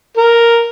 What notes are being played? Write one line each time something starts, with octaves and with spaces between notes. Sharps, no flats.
A#4